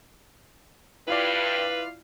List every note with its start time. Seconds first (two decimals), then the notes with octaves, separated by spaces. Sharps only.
1.08 G2 E4 F4 B4 D5 F5